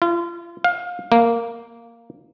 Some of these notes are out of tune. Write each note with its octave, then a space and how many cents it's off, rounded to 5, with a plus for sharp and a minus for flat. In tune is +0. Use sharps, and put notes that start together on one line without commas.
F4 -35
F5 +25
A#3 -5